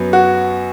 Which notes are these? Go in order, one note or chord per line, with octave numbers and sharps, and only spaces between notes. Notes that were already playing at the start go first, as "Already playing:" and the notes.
Already playing: F#2 F#3 B3
F#4